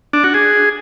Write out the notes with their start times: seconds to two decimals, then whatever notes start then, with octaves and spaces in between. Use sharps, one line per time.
0.13 D4
0.24 F#4
0.34 G#4